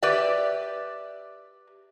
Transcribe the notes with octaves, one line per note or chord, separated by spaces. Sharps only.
G4 B4 D5 E5